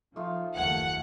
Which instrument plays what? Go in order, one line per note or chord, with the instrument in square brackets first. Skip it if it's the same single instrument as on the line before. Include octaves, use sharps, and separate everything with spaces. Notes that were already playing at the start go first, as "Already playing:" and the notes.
[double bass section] F3 [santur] A3 D#4 F4
[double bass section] F#1 D#2 A3 [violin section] F#5 [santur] G#5